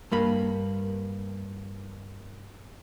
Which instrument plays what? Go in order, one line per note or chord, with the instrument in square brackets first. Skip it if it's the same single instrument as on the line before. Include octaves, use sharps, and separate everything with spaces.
[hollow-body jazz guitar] G2 A#3 B5